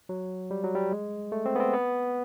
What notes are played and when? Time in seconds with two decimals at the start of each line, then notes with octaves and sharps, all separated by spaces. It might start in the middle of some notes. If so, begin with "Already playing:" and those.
0.09 F#3
0.51 G3
0.64 F#3
0.75 G3
0.92 G#3
1.32 A3
1.46 C4
1.55 B3
1.60 C4
1.73 B3